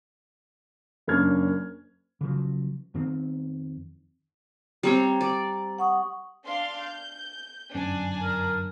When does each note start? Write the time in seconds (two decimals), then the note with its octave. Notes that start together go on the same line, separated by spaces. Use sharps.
1.07 F#1 A#3 C#4 D4 F6 G#6
2.21 C#3 F3 F#3
2.94 F2 D#3 C4
4.83 G3 C4 C#5 A#5
5.21 D5
5.78 F#5 C#6 D#6
6.44 D4 F5 C6
6.81 G6
7.74 G1 F#2 C#4 D4 G#5
8.23 A#4